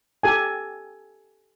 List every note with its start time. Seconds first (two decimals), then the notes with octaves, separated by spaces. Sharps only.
0.23 G4 A4 G#5